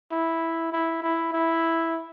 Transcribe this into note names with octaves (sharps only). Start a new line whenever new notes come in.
E4
E4
E4
E4